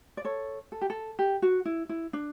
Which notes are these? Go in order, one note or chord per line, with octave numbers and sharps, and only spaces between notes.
D5
A4 C#5
A4
G4
A4
G4
F#4
E4
E4
D4